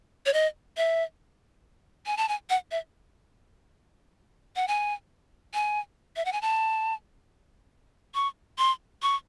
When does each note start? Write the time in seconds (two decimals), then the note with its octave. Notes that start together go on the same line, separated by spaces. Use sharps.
0.26 C#5
0.34 D#5
0.77 E5
2.06 G#5
2.17 A5
2.28 G#5
2.50 F#5
2.71 E5
4.56 F#5
4.68 G#5
5.54 G#5
6.16 E5
6.25 F#5
6.33 G#5
6.42 A5
8.15 C#6
8.58 C6
9.02 C#6